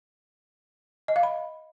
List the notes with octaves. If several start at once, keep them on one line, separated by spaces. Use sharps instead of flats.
D#5
F5
B5